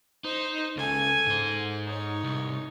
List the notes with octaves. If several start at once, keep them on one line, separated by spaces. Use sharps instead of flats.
D#4 C5
C#2 A4 G#5
G#2 C5
D#4 C#5
C2